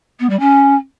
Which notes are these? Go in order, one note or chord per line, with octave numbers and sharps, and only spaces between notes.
B3
G3
C#4